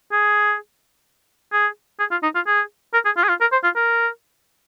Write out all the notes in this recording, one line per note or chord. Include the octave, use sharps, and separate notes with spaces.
G#4
G#4
G#4
F4
D#4
F4
G#4
A#4
G#4
F4
G#4
F4
A#4
C5
F4
A#4